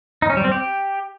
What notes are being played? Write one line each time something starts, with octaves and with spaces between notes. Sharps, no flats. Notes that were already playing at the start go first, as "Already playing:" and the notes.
D#4
C#4
G3
C4
G4